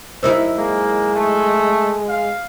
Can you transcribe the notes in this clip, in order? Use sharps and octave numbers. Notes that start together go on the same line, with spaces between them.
F#2 D#4 E4 G4 A#4 C5
G#3 A#3
A3
F5